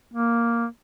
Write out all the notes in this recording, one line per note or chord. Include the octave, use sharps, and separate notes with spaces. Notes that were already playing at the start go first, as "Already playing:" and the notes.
A#3